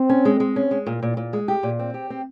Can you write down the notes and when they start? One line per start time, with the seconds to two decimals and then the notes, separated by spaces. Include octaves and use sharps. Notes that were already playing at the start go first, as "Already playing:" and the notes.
Already playing: C4
0.09 C#4
0.25 G#3
0.40 G#3
0.56 C#4
0.71 G#3
0.87 A#2
1.03 A#2
1.17 A#2
1.33 G#3
1.48 G4
1.63 A#2
1.79 C4
1.94 G4
2.10 C4